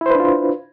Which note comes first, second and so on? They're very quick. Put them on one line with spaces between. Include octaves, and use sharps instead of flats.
E4 C5 B4 D4 F4